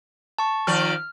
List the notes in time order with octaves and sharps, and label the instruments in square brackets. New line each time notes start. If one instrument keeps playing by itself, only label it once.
[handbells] A5 C#6
[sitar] D#3 F3 D5 [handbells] F6